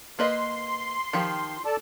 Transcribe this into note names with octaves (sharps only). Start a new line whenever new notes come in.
A#3 B4 D#5 C6
D#3 F3 G4
A4 D5 A5